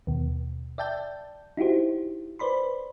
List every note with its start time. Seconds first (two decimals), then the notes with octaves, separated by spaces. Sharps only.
0.07 D#2 B2
0.78 D5 E5 G5 A5 G6
1.57 D#4 E4 F#4 G4 C5
2.39 B4 C5 D5 B5 C6